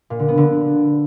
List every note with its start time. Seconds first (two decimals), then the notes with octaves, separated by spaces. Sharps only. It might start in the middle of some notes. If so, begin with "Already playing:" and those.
0.10 A#2
0.19 D3
0.28 B3
0.38 D3